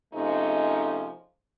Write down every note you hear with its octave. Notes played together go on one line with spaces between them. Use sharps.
C3 F3 G#3 A3 C#4 D#4